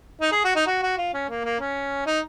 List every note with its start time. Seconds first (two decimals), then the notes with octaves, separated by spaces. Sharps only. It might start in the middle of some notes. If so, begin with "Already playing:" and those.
0.21 D#4
0.32 G#4
0.44 F#4
0.56 D#4
0.67 F#4
0.83 F#4
0.98 F4
1.14 C#4
1.29 A#3
1.44 A#3
1.60 C#4
2.06 D#4